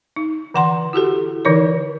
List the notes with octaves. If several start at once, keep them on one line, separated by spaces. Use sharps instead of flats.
D#4
D3 E3 F#5 A#5 C6
E4 F#4 G4 A4
D3 E3 D#4 A#4 C#5